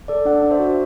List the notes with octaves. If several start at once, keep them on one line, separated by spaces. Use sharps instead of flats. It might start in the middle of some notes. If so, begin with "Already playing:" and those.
A4 D5
D4 D5 F#5
D4
C5 E5
F#4